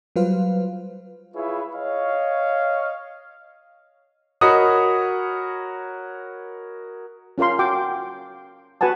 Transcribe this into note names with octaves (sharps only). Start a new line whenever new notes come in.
F#3 G3 F4 B4 C5 F5
E4 F4 G#4 B4 C#5 E5
C#5 D#5 F5
F#4 A#4 C#5 D#5 B5 D#6
C#4 F4 A#4 F5 C6
F#4 G5 A5 D6
F#4 B4 F#5 G#5 A5